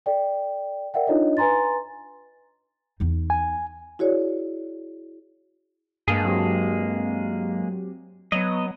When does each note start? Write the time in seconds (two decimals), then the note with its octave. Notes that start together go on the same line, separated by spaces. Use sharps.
0.06 A4 D5 G5
0.94 A#4 D5 E5 F#5 G5
1.07 D4 D#4 F4 A4 C#5 D#5
1.37 B4 G#5 A#5 C6 A6
3.00 E2 D#4
3.30 G#5
3.99 E4 F#4 G#4 C#5 D5
6.08 G2 G#3 A#3 G#4 A5
6.25 F#3 C4 G4
8.32 F#3 B3 D#5